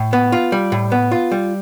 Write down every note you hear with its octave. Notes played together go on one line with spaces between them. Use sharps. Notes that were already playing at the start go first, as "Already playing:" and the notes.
Already playing: A2
B3
F4
G3
A2
B3
F4
G3